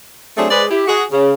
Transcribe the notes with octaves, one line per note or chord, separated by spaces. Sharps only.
F#3 A3 C4 D4 G#4
G#3 G#4 B4 C5 D5
E4 G4
F#4 G#4
C#3